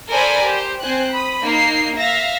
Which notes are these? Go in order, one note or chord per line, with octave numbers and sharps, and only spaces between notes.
A4 A#4 C5 D5 G#5 B5
G4 C5
C4 C5 G#5 F#6
B5 D#6
A#3 D#4 C7
E5 F5 A#6